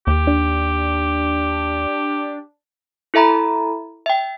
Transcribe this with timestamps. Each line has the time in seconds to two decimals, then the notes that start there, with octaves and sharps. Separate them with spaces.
0.07 D#2 G4
0.27 D4
3.14 E4 A4 E5 A#5 B5
4.06 E5 G5